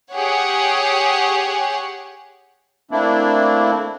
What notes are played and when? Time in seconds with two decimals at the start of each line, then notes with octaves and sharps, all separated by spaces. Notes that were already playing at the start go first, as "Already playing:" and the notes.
0.12 G4 G#4 C#5 F#5
2.91 A3 A#3 C4 D4 E4